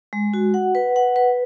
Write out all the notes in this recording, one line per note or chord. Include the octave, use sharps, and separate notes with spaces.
G#3
F#4
F#5
B4
F#5
B4